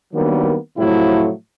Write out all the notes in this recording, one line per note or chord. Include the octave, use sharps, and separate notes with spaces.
D#3 F#3 G3 A#3 B3 D4
A2 C3 F3 F#3 A3 E4